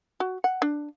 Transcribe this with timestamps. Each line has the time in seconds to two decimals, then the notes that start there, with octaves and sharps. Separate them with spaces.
0.20 F#4
0.44 F#5
0.62 D4